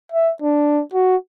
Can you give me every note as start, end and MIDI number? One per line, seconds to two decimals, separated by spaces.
0.12 0.32 76
0.42 0.82 62
0.94 1.16 66